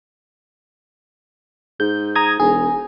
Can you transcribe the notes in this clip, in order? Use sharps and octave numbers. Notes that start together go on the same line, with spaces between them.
G#2 G6
A#5 D#6 G#6
E1 G#4